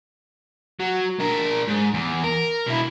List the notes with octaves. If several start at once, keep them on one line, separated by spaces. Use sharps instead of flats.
F#3
D4 A#4
G#2
E2
A#4
B2 E4